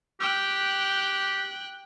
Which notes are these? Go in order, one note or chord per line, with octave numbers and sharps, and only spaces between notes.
G4 G5 F#6